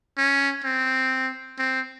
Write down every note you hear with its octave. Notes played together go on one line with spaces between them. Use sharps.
C#4
C4
C4